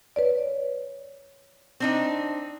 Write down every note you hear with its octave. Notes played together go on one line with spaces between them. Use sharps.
B4 C#5 D5
C4 D4 D#4